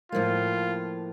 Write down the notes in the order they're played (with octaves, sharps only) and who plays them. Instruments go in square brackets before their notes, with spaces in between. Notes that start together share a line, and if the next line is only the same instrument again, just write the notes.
[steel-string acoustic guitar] A2 F3 A#3 [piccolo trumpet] F4